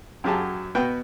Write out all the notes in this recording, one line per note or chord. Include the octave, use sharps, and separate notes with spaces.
F#2 F#3 G4 G#4 A5
B2 F#4 B4 G5